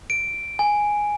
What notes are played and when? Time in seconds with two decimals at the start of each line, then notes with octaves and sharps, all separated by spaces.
0.10 D7
0.59 G#5